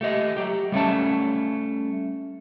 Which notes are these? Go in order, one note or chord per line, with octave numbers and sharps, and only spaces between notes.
A3 G4 D#5
F#3 G4
G3 A3 C#4 A5